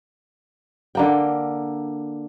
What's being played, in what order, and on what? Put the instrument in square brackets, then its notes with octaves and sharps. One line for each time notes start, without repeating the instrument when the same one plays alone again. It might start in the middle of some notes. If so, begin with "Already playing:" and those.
[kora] D3 A#3 G5